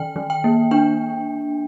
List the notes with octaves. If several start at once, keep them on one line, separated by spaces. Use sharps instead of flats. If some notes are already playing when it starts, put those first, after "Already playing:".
Already playing: D#3 G5
D#3
G5
A#3
D4 G5